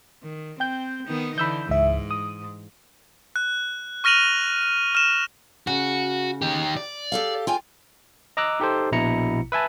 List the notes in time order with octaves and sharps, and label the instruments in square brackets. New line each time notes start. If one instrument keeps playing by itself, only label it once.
[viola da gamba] D#3
[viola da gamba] C4 [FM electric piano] G5 G6
[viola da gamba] D#3 B3 D#4
[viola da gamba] D3 E3 [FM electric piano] B5 E6 G6
[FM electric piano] C#2 E5 [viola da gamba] G#2
[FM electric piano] D#6
[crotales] F#6
C#6 F6 A#6 D#7 F7 F#7
F6 E7
[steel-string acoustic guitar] C#3 [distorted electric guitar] F#4
[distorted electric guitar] D#3 G4
D5
[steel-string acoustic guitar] G4 A4 F5
F4 G5 G#5
[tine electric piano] D#5 A#5 D6 E6 F#6
D#4 G4 A4 C5
A#1 B2 E4 A#5 C#7
B4 E5 G#5 A5